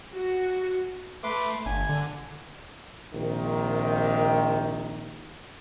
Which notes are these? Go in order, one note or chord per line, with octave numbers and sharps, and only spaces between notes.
F#4
A3 B4 C6 D6
G1 G#5
D3
A#1 C3 D#3